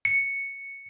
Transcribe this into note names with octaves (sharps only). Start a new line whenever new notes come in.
C#7